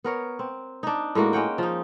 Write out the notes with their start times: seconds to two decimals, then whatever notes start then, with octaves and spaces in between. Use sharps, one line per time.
0.04 B3 A#4 C#5
0.39 C4
0.83 D4 D#4
1.15 A2 G#3 A#3 F#4
1.33 G#3 C#4 F#5 G5
1.58 F3 D#4